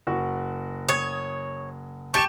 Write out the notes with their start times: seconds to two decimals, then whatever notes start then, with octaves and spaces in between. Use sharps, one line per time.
0.07 F#1 F#4
0.89 C#5 D#6 G#6
2.14 G4 A5 C#6 G6 D7 E7